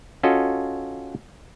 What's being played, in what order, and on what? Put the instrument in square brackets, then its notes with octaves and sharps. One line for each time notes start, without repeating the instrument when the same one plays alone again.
[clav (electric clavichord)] C#4 F4 F#4 A4 D#5